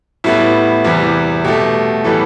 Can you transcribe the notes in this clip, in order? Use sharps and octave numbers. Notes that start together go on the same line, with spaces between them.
A2 G3 B3 E4
E2 C3 E3 G3
B2 A3 G4
A2 E3 G3 B3 A4